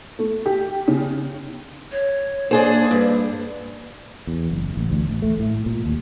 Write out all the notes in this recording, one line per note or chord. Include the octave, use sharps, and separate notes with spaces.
A3
G4
C#3
C#5
A#3 D4 G#4 C5
G2
E2
F#1
A1
D2
A1
A3
A2
A#2
D#2